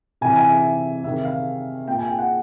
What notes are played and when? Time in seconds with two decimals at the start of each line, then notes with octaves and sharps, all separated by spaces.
0.21 C3 E3 G#5
0.36 G#5
0.49 E5
1.04 C3 D#3 E5
1.25 F5
1.88 A#2 G5
1.98 G#5
2.08 G5
2.19 F#5